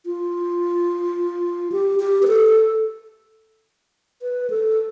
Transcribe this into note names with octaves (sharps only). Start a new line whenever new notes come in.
F4
G4
G4
B4
A4
B4
A4